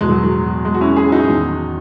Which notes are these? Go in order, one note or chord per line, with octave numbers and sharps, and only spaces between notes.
E2 B2 G#3
F#3
F#3
G#3
F#4
C#4 E4
E4 G#4
D#4 F#4
E2 D#3